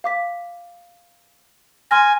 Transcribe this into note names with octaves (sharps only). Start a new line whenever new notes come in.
F5 D6 B6
G#5 C6 F6 A#6